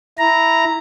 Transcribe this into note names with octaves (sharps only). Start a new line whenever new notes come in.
E4 A#5